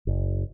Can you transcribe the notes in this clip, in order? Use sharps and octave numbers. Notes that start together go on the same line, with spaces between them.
F#1